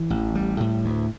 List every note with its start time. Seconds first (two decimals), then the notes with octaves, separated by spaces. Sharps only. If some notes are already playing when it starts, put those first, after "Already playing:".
Already playing: E3
0.10 A1
0.35 G3
0.60 A2
0.85 D2